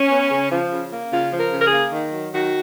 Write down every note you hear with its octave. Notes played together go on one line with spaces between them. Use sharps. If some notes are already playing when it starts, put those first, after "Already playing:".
Already playing: C#4
B3
C#3
F3
C#3
A#3
C#3 F4
F3
A#4
C#3
A#4
G#4
A#3
D#3
F#3
D#3 F#4